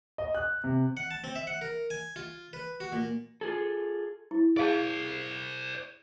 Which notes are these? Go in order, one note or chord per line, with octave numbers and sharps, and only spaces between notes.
D#5
F#6
C3
F#5
A5
C4
E5
F#5
A#4
G#5
F4
B4
F#4
A#2
F4 G#4 A4
E4
G#4 C5 D5 F5 A5